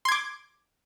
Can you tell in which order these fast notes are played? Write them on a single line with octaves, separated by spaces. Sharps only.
C6 G#6 D6